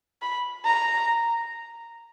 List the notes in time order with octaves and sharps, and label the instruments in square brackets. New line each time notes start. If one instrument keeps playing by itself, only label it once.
[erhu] B5
A#5